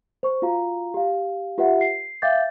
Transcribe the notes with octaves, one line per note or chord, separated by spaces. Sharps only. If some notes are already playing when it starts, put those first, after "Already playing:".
C5 C#6
F4 F#4 F5 A#5
G4 F5
F4 G4 B4 C#5 E5 F#5
C7
E5 F5 G5 D6 G6 A6